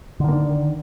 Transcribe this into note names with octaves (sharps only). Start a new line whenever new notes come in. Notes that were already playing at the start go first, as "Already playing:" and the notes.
D3 D#3 A#3 D4